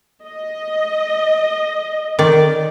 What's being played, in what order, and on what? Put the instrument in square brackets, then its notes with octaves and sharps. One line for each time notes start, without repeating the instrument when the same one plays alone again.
[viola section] D#5
[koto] D#3 D5